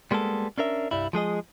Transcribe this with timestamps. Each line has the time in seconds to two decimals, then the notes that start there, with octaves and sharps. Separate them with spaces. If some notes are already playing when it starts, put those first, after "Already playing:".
0.11 G3 G#3 A#3 B3 A4
0.58 C#4 D4 A#4 E5
0.91 C2 G2 G3 E4
1.13 F3 G#3 G#4 D#5